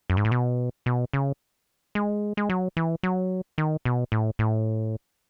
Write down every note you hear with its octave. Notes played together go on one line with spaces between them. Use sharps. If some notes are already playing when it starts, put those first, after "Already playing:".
F#2
G#2
A2
B2
B2
C#3
G#3
G#3
F#3
E3
F#3
D#3
B2
A2
A2